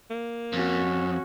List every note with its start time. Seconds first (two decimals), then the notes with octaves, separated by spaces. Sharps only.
0.10 A#3
0.53 F2 C#4 F#4